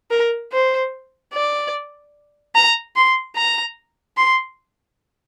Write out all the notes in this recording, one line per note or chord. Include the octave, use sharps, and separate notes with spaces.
A#4
C5
D5
A#5
C6
A#5
C6